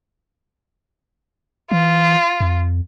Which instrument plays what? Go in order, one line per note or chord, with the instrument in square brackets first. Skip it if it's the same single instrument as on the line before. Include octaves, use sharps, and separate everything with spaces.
[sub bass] E3 [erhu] F4
[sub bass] F2